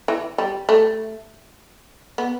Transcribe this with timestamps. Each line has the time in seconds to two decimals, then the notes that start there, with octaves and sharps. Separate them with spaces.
0.08 E3
0.38 G3
0.69 A3
2.18 B3